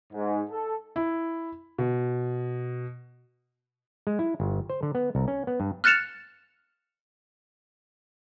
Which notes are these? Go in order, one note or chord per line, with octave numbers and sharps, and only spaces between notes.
G#2
A4
E4
B2
G#3
E4
G1
C5
D3
B3
C2
C#4
B3
G2
F6 F#6 A6 C#7 E7 F7